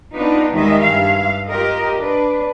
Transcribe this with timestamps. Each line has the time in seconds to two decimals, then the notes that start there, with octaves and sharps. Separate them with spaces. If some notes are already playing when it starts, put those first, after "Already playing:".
0.14 B3 D4 D#4 F4 B4
0.53 D#2 D#3 G3 G#3 D#5 E5
0.83 G2 E5 F5
1.48 F4 G4 A#4 D#5
1.98 D4 B4